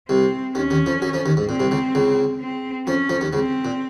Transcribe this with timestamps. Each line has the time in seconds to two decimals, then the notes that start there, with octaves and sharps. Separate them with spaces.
0.09 C2 C3 C4
0.55 D#2 D#3 C#4
0.71 D#2 D#3
0.86 F2 F3
1.02 F#2 F#3
1.13 F2 F3
1.26 D#2 D#3
1.37 G#2
1.49 A#2 C4
1.60 C2 C3
1.71 C#2 C#3
1.95 C#2 C#3
2.41 C4
2.87 F2 F3 C#4
3.10 F2 F3
3.21 D#2 D#3
3.33 C#2 C#3 C4
3.65 A#2